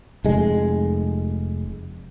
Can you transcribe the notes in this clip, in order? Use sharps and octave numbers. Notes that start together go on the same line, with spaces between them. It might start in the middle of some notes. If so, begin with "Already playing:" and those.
F1 G#3